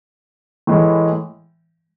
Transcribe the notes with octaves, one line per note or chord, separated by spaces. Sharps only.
A2 E3 G#3